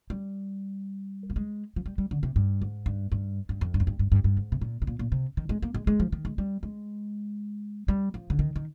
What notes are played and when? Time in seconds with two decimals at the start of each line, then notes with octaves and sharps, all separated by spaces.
0.10 G3
1.30 A#3
1.36 G#3
1.76 F3
1.86 G3
1.98 G3
2.11 D3
2.23 C3
2.36 G2
2.62 G#2
2.86 G2
3.12 G2
3.49 G2
3.61 F2
3.74 G2
3.80 F2
3.87 G2
3.99 G2
4.12 G2
4.24 G2
4.37 G#2
4.52 C3
4.61 A#2
4.82 C3
4.87 A#2
4.99 A#2
5.12 C3
5.37 D#3
5.49 G#3
5.62 A#3
5.74 G#3
5.87 G#3
6.00 F3
6.12 D#3
6.25 G#3
6.38 G3
6.63 G#3
7.88 G3
8.14 F3
8.30 D3
8.39 D#3
8.56 D#3